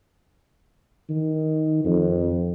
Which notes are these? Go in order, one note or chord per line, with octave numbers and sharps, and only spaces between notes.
D#3
F2